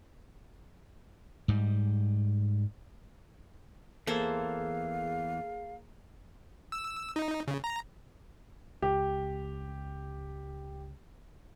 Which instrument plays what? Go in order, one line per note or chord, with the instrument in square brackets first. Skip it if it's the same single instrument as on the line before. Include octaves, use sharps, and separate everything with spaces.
[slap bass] G#2 G3
[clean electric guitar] E2 E3 [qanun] A#3 A4 C5 [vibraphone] G#4 [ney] F5
[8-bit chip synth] E6
D#4
C#3
A#5
[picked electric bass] C#2 [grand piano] G4